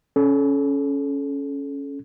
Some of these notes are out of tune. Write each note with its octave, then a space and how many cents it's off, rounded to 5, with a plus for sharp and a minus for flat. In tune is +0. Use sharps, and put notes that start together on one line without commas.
C#4 +5 A4 -30